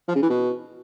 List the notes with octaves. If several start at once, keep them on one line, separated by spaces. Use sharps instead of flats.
F3
C#3
E3
B2